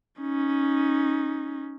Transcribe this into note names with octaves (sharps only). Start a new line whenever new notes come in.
C#4 D#4